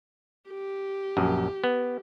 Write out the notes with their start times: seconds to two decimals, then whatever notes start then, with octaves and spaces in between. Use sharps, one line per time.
0.49 G4
1.17 A#1 F#2
1.64 B3